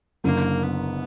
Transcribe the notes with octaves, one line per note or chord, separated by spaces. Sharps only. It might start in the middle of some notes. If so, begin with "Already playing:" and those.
F#1 F#2 D3 A#3
B3